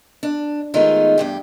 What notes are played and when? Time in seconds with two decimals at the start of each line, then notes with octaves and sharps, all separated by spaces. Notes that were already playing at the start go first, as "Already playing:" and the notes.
0.23 D4
0.74 D#3 G#3 A3 B3 D#4 F4
1.18 E2 G2 G4